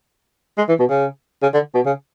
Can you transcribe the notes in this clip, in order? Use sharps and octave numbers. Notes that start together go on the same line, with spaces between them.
G#3
E3
B2
C#3
C#3
D3
B2
C#3